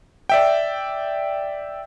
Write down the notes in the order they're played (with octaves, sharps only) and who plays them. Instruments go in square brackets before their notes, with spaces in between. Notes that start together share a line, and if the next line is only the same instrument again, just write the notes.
[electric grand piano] D5 E5 G5